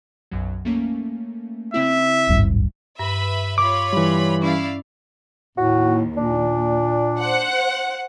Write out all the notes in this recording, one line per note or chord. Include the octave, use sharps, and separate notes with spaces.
B1 F#2 F#3
A3 A#3 C#4
C#3 C4 E4 E5
D1 G#1 G2
G2 B4 E5 B5
F4 C#5 B5 D6
E3 G3
C#4 E4 D5 F5
D#2 A2 F#4
A#2 D4
C5 F#5